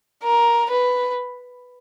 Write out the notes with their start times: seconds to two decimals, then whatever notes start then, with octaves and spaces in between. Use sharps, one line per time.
0.24 A#4
0.71 B4